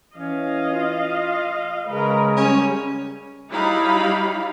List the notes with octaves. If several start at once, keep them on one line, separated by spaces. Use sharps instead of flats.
E3 C#4 D#5 F5
F4
C#3 G#3 A#4 B4
G3 C#4
F#3 G3 D#4 E4 F5 B5